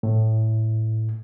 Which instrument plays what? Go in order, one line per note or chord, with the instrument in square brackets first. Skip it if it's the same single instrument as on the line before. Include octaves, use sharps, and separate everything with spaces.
[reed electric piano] A2